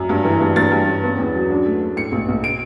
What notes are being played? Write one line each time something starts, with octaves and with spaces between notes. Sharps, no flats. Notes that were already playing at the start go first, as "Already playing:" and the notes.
Already playing: F#2
G2
E3
G2
G2 A6
G2
C#4
B3
E2
F#3
D4
A3
A3
A2 C#7
B1
B1
D7